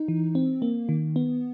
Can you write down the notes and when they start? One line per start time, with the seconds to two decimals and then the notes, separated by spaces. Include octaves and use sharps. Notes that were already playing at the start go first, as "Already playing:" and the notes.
Already playing: D#4
0.08 E3
0.35 C4
0.62 A#3
0.89 D#3
1.16 B3